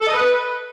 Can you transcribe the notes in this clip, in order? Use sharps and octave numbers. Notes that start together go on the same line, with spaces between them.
A4
D#5
B4